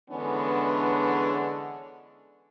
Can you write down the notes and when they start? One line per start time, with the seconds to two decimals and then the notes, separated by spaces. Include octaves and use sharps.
0.11 D3 E3 G#3 B3 C#4 D4